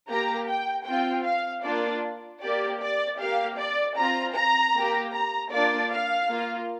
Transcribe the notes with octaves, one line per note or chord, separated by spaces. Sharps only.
A#3 G4 A#5
G5
C4 F4 G5
F5
A#3 D4 F4 D5
A#3 G4 D5
D5
A#3 G4 F5
D5
C4 F4 A#5
A#5
A#3 G4
A#5
A#3 D4 F4 D5
F5
A#3 F4